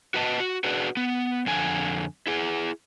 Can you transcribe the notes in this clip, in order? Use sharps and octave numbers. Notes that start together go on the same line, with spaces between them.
F#4 B4 D#5 A5
F#4
D4 F#4 G#4 B4
B3
F2 D3 G#5
E4 G#4